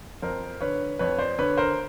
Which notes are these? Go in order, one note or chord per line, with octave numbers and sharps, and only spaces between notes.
F2 A#4 C5
D3 B4 C#5
F2 B4 C#5
C5 D5
D3 B4 C#5
A#4 C5